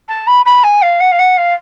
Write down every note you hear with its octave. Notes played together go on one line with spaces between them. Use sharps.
A5
B5
B5
G#5
F5
F#5
F5
F#5
F5